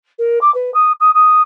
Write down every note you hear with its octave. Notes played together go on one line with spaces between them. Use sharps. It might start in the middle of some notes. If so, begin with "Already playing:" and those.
A#4
D6
B4
D#6
D#6
D#6